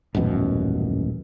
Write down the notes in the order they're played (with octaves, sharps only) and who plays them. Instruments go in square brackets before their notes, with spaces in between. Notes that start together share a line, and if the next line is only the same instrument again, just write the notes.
[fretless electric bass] D#1 A1 F#2 B2